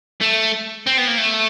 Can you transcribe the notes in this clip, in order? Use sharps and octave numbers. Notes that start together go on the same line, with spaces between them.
A3
C4
B3
A#3
A3